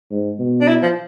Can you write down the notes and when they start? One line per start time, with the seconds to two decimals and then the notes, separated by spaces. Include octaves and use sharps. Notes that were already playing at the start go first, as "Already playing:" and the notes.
0.11 G#2
0.39 B2
0.61 D4
0.68 E4
0.82 F3